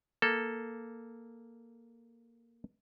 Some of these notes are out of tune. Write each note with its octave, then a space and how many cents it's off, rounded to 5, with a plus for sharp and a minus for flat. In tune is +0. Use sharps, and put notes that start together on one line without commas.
A#3 +0 A4 +0